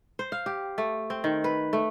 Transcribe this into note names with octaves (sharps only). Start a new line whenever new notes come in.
C5
F5
G4
A3
C4
D#3
B4
A3